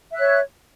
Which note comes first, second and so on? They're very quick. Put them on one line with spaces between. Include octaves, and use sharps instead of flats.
E5 F#6 C#5